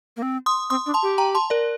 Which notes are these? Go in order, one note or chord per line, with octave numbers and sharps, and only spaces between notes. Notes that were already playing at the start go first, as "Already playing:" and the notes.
A#3
C4
C6 D#6
C4 C6 D#6
D4
A5 C6
G4
G5 A#5
A5 C6
A#4 D5